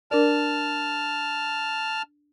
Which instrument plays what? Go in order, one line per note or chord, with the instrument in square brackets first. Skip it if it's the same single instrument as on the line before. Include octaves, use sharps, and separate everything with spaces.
[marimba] D4 A#4 D5 [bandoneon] A5 F6